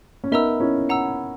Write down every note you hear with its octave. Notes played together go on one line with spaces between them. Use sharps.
C#4
B3 D#4 A#4 E5 A#5 E6
C#4 E4
F#5 A#5 E6